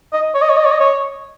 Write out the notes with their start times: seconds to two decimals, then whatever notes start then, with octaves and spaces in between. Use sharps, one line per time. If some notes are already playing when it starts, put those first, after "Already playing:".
0.13 D#5
0.34 C#5
0.42 D#5
0.49 C#5
0.57 D#5
0.65 C#5
0.72 D#5
0.80 C#5